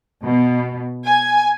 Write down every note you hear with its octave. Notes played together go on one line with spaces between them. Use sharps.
B2
G#5